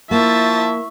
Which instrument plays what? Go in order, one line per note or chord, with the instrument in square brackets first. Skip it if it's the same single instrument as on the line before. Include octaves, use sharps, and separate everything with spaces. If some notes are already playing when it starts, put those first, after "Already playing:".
[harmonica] F3 A5 [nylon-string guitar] A#3 [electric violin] E4 E5 [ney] C#6